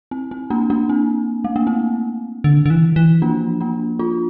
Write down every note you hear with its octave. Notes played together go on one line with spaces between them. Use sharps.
C4
C4
A#3 D4
A#3 D4
C4
A3
A#3
C4
D3
D3
E3
E3
F3 A#3 D4
A#3 D4
D4 F4